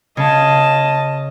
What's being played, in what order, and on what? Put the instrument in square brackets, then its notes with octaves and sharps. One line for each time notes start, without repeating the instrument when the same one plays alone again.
[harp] C#3 [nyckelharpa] D#5 A5